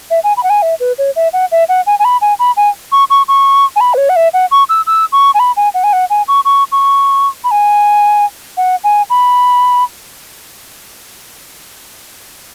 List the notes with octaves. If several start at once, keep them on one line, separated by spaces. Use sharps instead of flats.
E5
G#5
B5
F#5
G#5
E5
B4
C#5
E5
F#5
E5
F#5
G#5
G#5
B5
G#5
B5
G#5
C#6
C#6
C#6
G#5
B5
B4
C#5
F#5
E5
F#5
C#6
E6
E6
C#6
G#5
B5
G#5
F#5
G#5
F#5
G#5
C#6
C#6
C#6
B5
G#5
F#5
G#5
B5